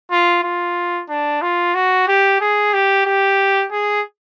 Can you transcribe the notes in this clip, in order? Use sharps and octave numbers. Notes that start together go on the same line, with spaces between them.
F4
F4
D4
F4
F#4
G4
G#4
G4
G4
G#4